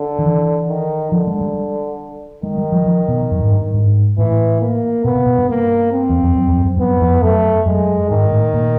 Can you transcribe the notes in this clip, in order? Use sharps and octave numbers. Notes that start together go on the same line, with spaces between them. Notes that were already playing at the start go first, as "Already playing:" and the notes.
Already playing: D3
D#3
E3
D#3
D3 F3
G#3
G3
D#3 G#3
G3
F3
F3
B2
F#2
G#2
G2
G#2
A2 E3
A#3
B2 B3
C3
B2
G2
A#3
C4
E2
F2
F#2
F2
F#2
G2
F#2 B3
F2
F#2 A3
F#2 G#3
G#2 D#3
A2
A#2